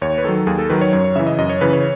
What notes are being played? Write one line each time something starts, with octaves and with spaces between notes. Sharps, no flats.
D#2 C#5
B4
D#3 F#3 A4
D#2 G#4
A4
D#3 F#3 B4
C#5
F#2 C#5
C#5
C#3 E3 E5
D#5
F#2 D#5
C#5
C#3 E3 B4
C#5